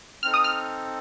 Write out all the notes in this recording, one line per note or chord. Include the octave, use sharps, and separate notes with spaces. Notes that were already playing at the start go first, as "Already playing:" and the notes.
C4 D#4 A4 F6
D#6
F6